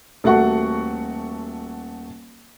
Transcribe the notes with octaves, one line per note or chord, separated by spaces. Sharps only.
D#1 A3 F#4 F#5 C#6